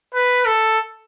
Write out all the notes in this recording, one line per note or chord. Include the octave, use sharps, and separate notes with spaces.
B4
A4